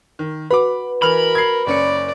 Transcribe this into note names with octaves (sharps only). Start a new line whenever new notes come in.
D#3
F#4 B4 B5 D6
E3 A#4 B5 F6 F7
G#6 C7
F#1 C#4 D5 C#7